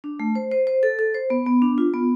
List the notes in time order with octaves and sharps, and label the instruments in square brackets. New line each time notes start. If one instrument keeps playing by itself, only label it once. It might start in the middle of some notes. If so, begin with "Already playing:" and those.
[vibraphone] D4
A3
C5
C5
C5
A4
A4
C5
B3
B3
D4
F4
B3